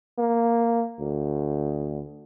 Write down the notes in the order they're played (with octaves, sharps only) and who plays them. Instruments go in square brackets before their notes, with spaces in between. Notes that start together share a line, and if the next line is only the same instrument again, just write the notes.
[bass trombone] A#3
D2